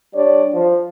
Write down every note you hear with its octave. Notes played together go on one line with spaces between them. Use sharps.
G3 D4 C#5 D5
F3